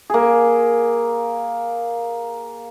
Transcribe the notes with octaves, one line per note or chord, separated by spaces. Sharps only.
A#3 G#4